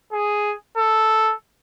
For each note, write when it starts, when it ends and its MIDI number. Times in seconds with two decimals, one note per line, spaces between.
0.13 0.54 68
0.77 1.34 69